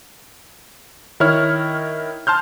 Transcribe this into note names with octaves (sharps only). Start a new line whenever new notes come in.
D#3 E4 C#5 F6
A5 C6 F6 G6